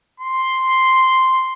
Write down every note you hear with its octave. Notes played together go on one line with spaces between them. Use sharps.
C6